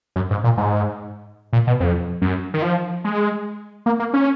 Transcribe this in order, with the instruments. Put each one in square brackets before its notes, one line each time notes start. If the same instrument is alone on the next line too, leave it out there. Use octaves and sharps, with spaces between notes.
[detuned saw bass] F#2
G#2
A#2
G#2
A#2
B2
F2
F#2
D#3
F3
G#3
A#3
A#3
C#4